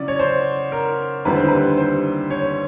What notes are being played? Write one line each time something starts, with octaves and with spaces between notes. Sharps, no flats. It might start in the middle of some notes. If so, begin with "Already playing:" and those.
Already playing: C#3 F#3 C#4 E4 D5
C#5
C5
A#4
D#2 D3 G3 C4 E4 B4
C5
B4
C5
C#5